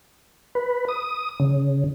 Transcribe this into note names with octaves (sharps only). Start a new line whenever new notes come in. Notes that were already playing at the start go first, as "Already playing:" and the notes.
B4
D#6
C#3